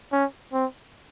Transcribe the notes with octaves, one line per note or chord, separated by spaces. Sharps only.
C#4
C4